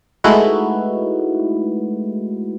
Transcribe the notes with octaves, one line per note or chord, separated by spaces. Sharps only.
G#3 A3 D#4 E4 F#4 B4